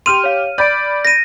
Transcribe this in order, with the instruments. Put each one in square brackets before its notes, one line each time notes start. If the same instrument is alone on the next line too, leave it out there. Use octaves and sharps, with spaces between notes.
[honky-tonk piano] G4 F6 F7 [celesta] C6 [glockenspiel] D#7
[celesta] C#5 F5
[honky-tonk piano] D5 B5 [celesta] G6 A6 D7
[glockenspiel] A#6 D#7